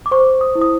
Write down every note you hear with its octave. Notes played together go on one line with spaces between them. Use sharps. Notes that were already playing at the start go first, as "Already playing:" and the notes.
D6
C5 C#6
D#6
E4
D#6